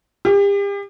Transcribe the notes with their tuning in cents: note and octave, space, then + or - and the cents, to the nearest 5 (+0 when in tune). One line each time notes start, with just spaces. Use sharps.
G4 +40